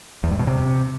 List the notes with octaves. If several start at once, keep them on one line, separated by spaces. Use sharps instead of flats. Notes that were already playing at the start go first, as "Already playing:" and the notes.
E2
G2
B2
C3